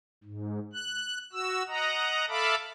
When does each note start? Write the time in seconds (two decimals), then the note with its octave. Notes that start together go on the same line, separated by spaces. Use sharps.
0.24 G#2
0.73 F#6
1.33 F#4 E6
1.68 D#5 F#5 A#5
2.29 A4 E5 F5 A5 B5 D6